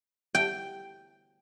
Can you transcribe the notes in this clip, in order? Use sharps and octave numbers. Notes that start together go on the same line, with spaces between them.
G5